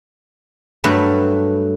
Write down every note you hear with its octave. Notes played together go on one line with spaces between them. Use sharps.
G2 F#3 A3 B4 B5